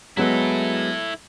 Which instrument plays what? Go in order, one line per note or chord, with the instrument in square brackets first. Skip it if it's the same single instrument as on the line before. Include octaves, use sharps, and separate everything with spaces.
[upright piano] F#3 G#3 B3 [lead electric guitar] E4 A4